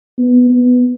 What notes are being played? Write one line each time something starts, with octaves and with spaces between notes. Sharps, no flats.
B3
B3